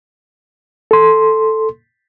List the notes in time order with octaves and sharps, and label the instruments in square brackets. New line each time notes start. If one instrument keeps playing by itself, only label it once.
[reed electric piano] A4 C6